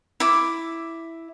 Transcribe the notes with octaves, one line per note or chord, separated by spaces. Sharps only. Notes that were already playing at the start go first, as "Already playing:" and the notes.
E4 D6